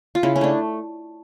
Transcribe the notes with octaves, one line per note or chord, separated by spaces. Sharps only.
F4
C#3 E4
C#4
A3 D4